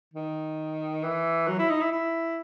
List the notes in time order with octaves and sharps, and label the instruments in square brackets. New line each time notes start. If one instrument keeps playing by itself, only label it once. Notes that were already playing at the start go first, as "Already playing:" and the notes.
[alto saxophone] D#3
E3
F#3
E4
D#4
E4
E4